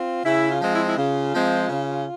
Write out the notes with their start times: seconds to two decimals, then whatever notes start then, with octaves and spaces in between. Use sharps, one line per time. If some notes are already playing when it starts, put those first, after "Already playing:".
Already playing: C4 F4
0.24 C#3 E4
0.49 F4
0.60 F3 G#3 C4
0.72 E4
0.88 E4
0.97 C#3 F4
1.33 F3 G#3 C4
1.69 C#3